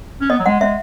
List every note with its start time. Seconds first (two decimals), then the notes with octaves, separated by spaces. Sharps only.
0.21 C#4
0.30 B3 D#5
0.39 F#3
0.45 G#3 F#5
0.61 G#3 E5